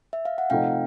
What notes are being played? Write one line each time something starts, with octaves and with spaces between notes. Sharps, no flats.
E5
F5
F#5
C3 F3 A3 C4 D#4 F5 G5